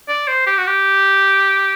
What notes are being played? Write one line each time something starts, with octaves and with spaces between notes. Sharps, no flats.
D5
C5
G4
F#4
G4